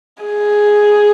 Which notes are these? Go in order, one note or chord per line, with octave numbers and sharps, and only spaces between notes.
G#4